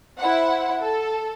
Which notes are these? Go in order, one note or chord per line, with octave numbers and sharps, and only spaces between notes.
E4 C5 F#5
A4